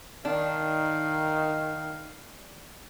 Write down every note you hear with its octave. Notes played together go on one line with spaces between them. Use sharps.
D#3 D4 F5